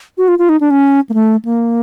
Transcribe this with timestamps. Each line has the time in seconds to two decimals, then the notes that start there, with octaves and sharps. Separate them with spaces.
0.18 F#4
0.28 F4
0.38 F4
0.49 D#4
0.61 D4
0.70 C#4
1.09 A#3
1.14 A3
1.45 A#3